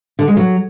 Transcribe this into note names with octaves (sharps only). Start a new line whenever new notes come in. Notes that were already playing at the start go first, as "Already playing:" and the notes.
D3
G#3
F#3